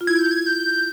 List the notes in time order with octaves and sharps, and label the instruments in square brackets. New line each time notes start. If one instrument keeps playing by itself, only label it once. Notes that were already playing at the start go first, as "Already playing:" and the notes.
[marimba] F4
[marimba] E4 [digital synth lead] G#6
[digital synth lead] G6
G#6
G6